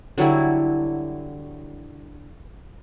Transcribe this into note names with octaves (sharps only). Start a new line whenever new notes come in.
D3 F#3 G3 E4